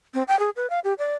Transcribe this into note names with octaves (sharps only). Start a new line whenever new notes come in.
C4
G5
G#4
B4
F5
G4
D5